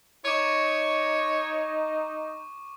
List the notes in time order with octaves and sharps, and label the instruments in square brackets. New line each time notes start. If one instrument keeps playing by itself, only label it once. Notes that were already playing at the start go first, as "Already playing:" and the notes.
[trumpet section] D#4 [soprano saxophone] C#5 [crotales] C#6 D6